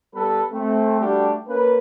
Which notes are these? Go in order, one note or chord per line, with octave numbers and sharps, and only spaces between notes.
G3 B3 A4 B4
A3 C4
G3 A3 D4 F#4 G4
A#3 C#4 B4